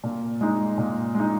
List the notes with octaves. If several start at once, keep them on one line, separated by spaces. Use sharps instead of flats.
A#2
G#3 D#4
A#2
G#3
D#4